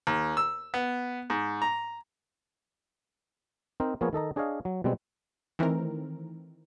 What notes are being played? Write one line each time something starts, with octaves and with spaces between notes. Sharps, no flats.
D#2
E6
B3
G#2
A#5
C4 D#4 A#4 C5
F3 A#3 B3 G#4 A#4 C#5
D#3 A4 D#5 A#5
D4 G#4 C#5 D#5 F5
F#3
B2 G3 G#3 C4
D#3 E3 A3 C4 A#4